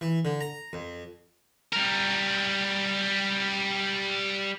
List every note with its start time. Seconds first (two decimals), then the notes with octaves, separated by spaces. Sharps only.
0.01 E3
0.25 D3
0.41 A#5
0.73 F2
1.72 G3 A#4